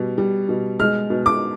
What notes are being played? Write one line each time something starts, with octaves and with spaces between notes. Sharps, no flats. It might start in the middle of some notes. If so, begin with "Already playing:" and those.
Already playing: B2 G3
G3
B2
G#3 F6
B2
D6